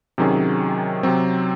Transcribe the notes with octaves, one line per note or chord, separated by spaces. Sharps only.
C3 D#3 F#3 C#4 G#4
C3 F#3 C4